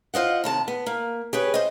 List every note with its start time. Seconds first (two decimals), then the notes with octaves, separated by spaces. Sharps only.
0.14 F4 C5 D#5 F#5
0.44 D#2 C3 A5
0.68 B3
0.86 A#3
1.33 G4 G#4 B4 C#5
1.54 C5 D#5